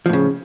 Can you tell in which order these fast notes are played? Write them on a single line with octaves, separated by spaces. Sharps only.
F3 A2 C#3